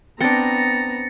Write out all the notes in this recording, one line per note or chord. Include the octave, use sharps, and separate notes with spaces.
B3 C4 D4 A#5 A6 A#6 C#7